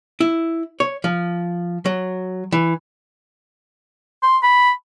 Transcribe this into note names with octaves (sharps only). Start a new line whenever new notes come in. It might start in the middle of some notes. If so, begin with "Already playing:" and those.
E4
C#5
F3
F#3
E3
C6
B5